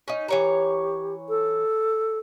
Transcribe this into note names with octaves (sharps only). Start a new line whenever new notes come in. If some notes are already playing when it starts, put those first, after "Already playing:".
C#4 D#4
E3 G4 C#5 A#5
A4